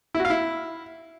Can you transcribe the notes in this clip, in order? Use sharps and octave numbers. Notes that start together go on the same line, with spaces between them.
E4
F#4
F5
E4